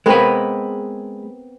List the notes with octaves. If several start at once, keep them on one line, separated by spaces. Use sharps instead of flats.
G#3 B3 C4 A#4 B4